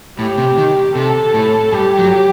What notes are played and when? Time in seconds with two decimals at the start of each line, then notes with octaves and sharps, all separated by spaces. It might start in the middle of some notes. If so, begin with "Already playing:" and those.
0.19 A2 G4
0.38 C3
0.57 D#3
0.95 C3 A4
1.34 A2
1.72 G2 G4
1.99 F#3